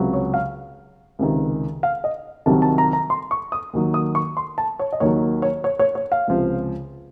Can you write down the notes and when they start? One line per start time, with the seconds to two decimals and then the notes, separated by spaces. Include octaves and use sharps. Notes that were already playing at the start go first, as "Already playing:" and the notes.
Already playing: C#2 C3 F#3
0.13 C#5
0.34 F5
1.19 C#2 C3 D#3
1.83 F5
2.04 D#5
2.46 C2 C3 D#3 F#3 A5
2.62 A5
2.78 A#5
2.93 A#5
3.10 C6
3.31 C#6
3.52 D#6
3.73 D#2 D#3 F#3
3.94 D#6
4.15 C#6
4.37 C6
4.58 A5
4.79 C#5
4.92 D#5
5.00 D#2 D#3 F#3 C#5
5.42 C#5
5.64 C#5
5.79 C#5
5.95 C#5
6.12 F5
6.28 C#2 C3 F3